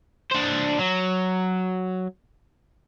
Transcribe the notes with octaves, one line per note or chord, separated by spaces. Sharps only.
D4 C5
F#3